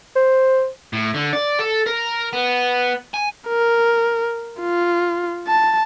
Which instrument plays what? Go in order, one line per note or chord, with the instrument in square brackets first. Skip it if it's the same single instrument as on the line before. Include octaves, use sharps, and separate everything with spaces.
[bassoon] C5
[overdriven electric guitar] A2
D3
D5
A4
A#4
B3
G#5
[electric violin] A#4
F4
A5